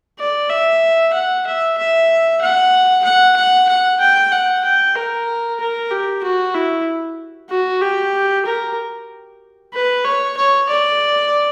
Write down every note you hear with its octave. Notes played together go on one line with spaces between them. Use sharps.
D5
E5
F#5
E5
E5
F#5
F#5
F#5
F#5
G5
F#5
G5
A#4
A#4
G4
F#4
E4
F#4
G4
A#4
B4
C#5
C#5
D5